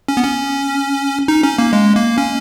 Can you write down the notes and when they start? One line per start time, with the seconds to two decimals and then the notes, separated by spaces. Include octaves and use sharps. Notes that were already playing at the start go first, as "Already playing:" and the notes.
0.08 C#4
0.17 B3
0.24 C#4
1.28 D#4
1.43 C#4
1.58 A#3
1.73 G#3
1.96 A#3
2.18 C#4